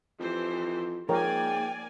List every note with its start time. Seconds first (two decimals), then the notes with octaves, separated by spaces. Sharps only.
0.20 F2 E3 G4 C5
1.09 G#2 F3 A#3 A#4 C#5 D5 G5 G#5